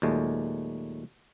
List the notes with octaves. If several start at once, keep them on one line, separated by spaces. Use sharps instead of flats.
D#2 A#2 F#3 G#3 A3